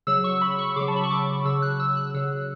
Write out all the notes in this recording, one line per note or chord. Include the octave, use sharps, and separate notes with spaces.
C#3 F#3 E6
C#6
B5
C#6
C#3 F#3 D6
A5
B5
C#6
D6
C#3 F#3 E6
F#6
E6
F#6
C#3 F#3 E6